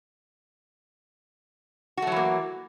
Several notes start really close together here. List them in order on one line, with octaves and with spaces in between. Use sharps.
F#4 A3 F#3 E3 A#3